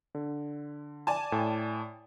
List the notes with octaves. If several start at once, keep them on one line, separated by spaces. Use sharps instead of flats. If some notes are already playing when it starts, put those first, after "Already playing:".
D3
D5 G#5 A5
A2 G5